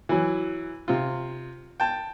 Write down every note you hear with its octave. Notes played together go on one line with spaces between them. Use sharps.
E3 F#3
C3 F4
G5 A5